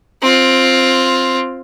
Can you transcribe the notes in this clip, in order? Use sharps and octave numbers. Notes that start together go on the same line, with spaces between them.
C4 F4